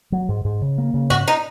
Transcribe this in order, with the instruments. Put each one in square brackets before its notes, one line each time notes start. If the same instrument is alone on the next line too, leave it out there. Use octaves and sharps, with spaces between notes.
[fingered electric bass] F#3
G#2
G#2
C#3
A#3
C#3
[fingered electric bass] G#2 [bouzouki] F#4
[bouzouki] D#4